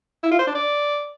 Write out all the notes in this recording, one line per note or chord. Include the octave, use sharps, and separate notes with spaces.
E4
F4
C5
D4
D5